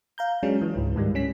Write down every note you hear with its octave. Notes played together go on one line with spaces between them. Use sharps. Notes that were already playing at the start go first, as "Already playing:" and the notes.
F5 A#5 G6
F#3 G#3 C#4 D4
E3
C#2 G#2
G#2 D#3 G3
C#4 B6